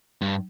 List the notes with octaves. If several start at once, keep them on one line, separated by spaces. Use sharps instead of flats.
G2